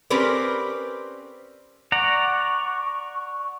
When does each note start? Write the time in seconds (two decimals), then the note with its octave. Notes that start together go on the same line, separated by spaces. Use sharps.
0.10 C4 C#4 G4 A#4 B4 D5
1.92 D5 F#5 A#5 C#6